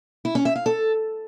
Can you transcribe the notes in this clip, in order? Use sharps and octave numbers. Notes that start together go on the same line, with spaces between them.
E4
C#4
E5
F5
A4